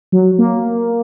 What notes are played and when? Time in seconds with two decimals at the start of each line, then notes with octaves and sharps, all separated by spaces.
0.12 F#3
0.39 A#3